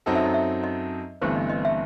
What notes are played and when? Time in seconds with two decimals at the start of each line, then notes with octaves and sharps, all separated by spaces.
0.06 F#2 F#3 C4 D#4 A4
0.15 E5
0.25 D#5
0.34 E5
0.64 D#5
1.22 G1 G2 E3 A3 C4 C5
1.36 D#5
1.49 D#5
1.65 E5